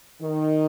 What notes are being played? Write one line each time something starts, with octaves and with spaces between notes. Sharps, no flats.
D#3